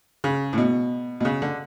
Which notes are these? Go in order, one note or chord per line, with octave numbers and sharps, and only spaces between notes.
C#3
A2
B2
B2
C#3
D3